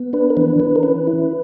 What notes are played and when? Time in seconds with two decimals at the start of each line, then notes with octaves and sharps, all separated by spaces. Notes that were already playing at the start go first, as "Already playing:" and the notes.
Already playing: B3
0.13 D4 B4
0.30 A#4
0.37 E3 B4
0.60 E3 B4
0.76 A#4
0.83 C#4 B4
1.07 E4